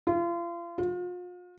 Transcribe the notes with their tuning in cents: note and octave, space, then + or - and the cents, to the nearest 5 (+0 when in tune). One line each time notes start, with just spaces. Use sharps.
F4 -35
F4 +40